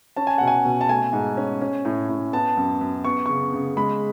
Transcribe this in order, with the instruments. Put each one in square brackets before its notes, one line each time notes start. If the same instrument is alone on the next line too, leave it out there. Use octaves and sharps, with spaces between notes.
[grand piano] C#4 A5
G#5
B2 F#5
G#5
B2
A5
A3 G#5
G#2
C#4
C#4
A2
A2
B3 A5
F#2
F#2
B3 C#6
C#3 C#6
C#3
G#3 B5